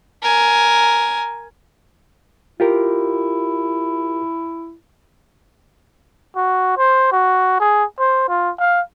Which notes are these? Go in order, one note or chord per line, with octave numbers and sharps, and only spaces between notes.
A#4 G#5
E4 F4 G4 A#4
F#4
C5
F#4
G#4
C5
F4
F5